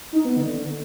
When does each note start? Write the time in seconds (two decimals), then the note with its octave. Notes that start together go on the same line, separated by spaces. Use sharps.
0.13 D#4
0.25 B3
0.37 D3